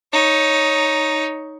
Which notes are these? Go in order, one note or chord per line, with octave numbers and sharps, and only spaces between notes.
D#4 C#5